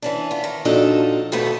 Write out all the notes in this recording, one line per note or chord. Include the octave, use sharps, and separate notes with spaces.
E3 C#4 D4
B3 F4
D#3
A#2 F3 F#3 D4 D#4 A4
D#2 G#2 B2 A3 B3 D#4